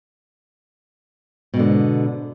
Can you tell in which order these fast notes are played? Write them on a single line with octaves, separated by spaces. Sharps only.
B2 G#2 D3